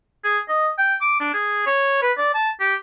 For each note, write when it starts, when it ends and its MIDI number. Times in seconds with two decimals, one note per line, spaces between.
0.24 0.39 68
0.49 0.70 75
0.78 0.95 79
1.01 1.16 86
1.20 1.33 62
1.33 1.62 68
1.66 2.01 73
2.02 2.12 71
2.18 2.33 74
2.34 2.50 81
2.60 2.75 67